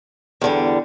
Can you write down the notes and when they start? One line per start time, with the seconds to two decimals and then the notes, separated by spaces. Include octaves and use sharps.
0.41 E2 D3 G3